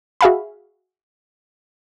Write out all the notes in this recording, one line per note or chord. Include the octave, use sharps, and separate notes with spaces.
F#4 G#4 E5 F5 G#5 B5